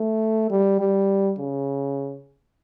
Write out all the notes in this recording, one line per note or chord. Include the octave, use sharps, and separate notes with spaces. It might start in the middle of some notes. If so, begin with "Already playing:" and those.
Already playing: A3
G3
G3
C#3